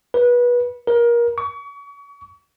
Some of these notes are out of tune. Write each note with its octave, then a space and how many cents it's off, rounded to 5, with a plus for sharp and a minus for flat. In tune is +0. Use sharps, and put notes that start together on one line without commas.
B4 -25
A#4 +25
C#6 +35